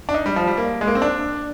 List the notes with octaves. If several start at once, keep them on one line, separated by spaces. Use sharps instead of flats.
D4
D#4
G3
F3
G3
A#3
G#3
A#3
C4
D4